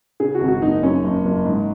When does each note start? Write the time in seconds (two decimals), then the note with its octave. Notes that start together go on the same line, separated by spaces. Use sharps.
0.20 C#3 G#4
0.35 F#4
0.41 G#1
0.48 F#4
0.62 F#1 D#4
0.83 F#2 C#4
1.04 F#1
1.25 F#1
1.45 G#2